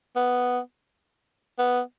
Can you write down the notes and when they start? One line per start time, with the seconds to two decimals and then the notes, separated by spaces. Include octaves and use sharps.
0.16 B3
1.59 B3